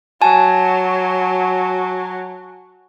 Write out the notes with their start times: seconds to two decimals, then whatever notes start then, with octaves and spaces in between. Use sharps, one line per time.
0.21 F#3 G#5 A5